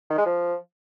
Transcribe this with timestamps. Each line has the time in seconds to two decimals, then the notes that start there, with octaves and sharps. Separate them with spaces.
0.10 D#3
0.18 G#3
0.26 F3